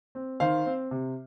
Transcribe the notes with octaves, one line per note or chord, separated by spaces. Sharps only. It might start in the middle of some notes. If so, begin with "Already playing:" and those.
C4
D#3 C5 F5
C4
C3